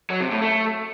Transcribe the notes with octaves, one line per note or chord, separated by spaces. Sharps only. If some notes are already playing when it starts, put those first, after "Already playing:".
F#3
C3
A2
A3